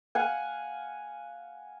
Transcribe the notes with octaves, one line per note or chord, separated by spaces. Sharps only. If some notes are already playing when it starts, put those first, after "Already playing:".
F5 F#5 G#5